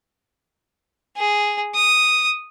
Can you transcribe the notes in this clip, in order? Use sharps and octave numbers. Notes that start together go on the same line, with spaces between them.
G#4
D#6